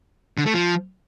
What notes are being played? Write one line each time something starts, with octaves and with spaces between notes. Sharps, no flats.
D3
A3
F3